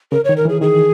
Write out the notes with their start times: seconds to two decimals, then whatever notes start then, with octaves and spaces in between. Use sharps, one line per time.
0.12 C#3 A#4
0.25 C#5
0.29 D#3
0.37 A#4
0.45 E3
0.49 G#4
0.61 D#3 G#4